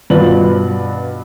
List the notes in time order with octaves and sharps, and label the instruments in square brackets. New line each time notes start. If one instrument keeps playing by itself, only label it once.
[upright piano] G2 B2 F4 B4 D5 F#7